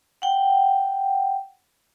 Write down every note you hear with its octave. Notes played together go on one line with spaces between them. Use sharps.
F#5 G5